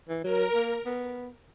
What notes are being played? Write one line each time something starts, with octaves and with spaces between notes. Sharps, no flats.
E3
F#3 A#4
A#3
B3